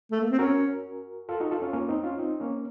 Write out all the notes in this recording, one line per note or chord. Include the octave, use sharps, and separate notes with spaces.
A3
A#3
C4
C#4 F#4 A#4
F4 A4
D#4 F#4
F4 A4
C#4 F4
A#3 C#4
C4 D#4
C#4 F4
C4 D#4
A#3 C#4